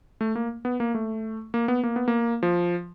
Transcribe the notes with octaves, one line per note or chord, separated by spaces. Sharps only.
A3
A#3
B3
A#3
A3
A#3
B3
A#3
B3
A#3
F3